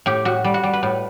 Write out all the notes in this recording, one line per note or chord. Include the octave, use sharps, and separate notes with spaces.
A2 G4
A2 F#4
G3
F#4
G3
B4
A2